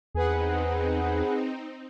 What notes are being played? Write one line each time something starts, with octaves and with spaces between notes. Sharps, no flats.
E2 C4 D#4 G#4 B4 F#5